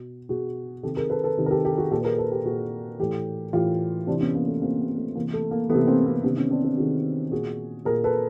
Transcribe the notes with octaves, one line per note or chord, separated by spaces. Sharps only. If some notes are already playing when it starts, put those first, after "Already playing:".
Already playing: B2
B2 F#4 G#4
C3 D#3 G4 A4
G#4 A#4
A4 B4
A4 B4
C3 D#3
A#4
G4 A4
G4 A4
F#4 G#4
A#2 G4 A4
B4
G#4 A#4
A4 B4
G4 A4
A#2 F#4 G#4
A2 E3 G4 A4
A2 E3 F4 G4
C3 E3 C4 D4
B3 C#4
A#3
A3 B3
C3 E3 A#3 C4
A3 B3
A3
C3 E3 A#3
A3
A#3
C3 E3 A3 B3
A#3 C4
A#3 C4
C3 D#3 B3 C#4
B3 C#4
C4 D4
C4 D4
C3 D#3 F#4 G#4
A#2 F#4 G#4
A#2 G#4 A#4
A4 B4